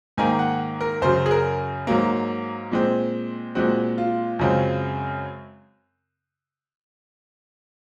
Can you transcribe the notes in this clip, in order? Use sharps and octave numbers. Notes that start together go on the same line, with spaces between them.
G#2 D#3 A#3 G#5
F#5
A#4
F#2 C#3 F#3 C5
G#4
A#4
G#2 F#3 A#3
A#2 G#3 C4
A#2 G#3 C4 F#4
F4
F#2 C#3 G#3 C4 F4